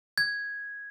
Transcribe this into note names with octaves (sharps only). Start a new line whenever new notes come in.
G#6